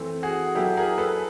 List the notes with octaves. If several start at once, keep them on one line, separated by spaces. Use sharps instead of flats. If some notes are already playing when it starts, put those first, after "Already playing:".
Already playing: E3 A3 C4
F#4 G#4
F#3 B3 E4 G4 A4
G#4 A#4
A4 B4